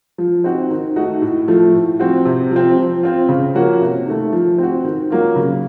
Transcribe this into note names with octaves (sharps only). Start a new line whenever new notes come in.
F3
C4 D#4 F#4
D#3
A3 D#4 F#4
A2
F3 A3
A2
F3 C4 F#4
C3
F3
C4
F3
C4 F4
C#3
F3 A#3 C#4 F#4
C3
D#3 A3
F3
C4 F#4
D#3
F#3 A#3 F4
C#3